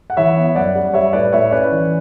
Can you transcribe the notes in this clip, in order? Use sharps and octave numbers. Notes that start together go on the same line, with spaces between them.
F#5
E3 C#5 E5
B3
F#2 D5 F#5
G3
G3 C#5 E5
A2 B4 D5
A2 C#5 E5
C#4 B4 D5
E3